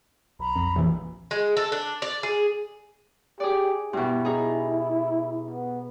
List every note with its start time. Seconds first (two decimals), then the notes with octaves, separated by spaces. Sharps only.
0.39 B1 A#5 B5
0.56 F2
0.76 A#1 E3
1.31 G#3
1.57 A4
1.72 D4
2.02 D5
2.23 G#4
3.40 G4 G#4 D5
3.93 G2 B2 E4
4.25 D#4 G#4
5.51 B3